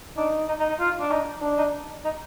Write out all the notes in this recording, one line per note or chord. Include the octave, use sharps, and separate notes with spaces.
D4 D#4
D#4
D#4
D#4
F4
D4
D4 D#4
D4
D#4
D#4